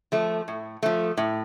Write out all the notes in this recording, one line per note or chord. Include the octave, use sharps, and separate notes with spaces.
F3 A3
A2
F3 A3
A2